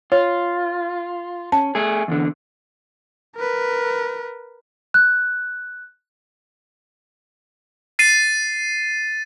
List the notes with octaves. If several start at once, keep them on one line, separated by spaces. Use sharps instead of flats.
F4 C#5
C#4 A5
A3 G#4
E2 D3
A#4 B4
F#6
A6 C7 D#7